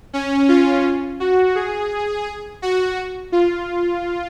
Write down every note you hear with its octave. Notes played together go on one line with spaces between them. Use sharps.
C#4
F4
F#4
G#4
F#4
F4